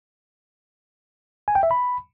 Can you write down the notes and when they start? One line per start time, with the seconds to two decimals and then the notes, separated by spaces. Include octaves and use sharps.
1.48 G#5
1.55 G5
1.63 E5
1.71 B5